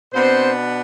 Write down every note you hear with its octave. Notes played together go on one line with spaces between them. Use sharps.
B2 B3 C4 D4 C5